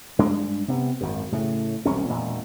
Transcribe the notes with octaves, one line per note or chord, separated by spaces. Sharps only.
G2 G#3 D4
C3 B3
G#1 F#2
A2 C#3 A3
E1 C2 C3 C#4
E1 A#2